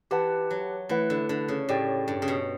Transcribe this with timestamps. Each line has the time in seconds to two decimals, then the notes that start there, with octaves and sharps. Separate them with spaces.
0.11 E3 G4 B4 F#5 A5
0.51 F#3
0.89 E3 A3 E4 B4 F#5
1.10 D3
1.29 D3
1.48 C#3
1.69 A2 G4 D5 G5
2.08 G2
2.22 C#3
2.28 B2